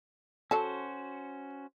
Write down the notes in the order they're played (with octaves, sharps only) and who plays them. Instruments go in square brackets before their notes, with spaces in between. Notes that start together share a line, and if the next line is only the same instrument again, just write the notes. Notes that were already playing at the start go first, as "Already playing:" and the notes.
[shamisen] F#3 A4 A5 [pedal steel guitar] C#4 F#4 C5